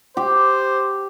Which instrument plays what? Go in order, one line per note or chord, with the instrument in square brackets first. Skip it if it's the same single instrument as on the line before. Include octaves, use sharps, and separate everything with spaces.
[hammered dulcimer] G4 [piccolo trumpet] C5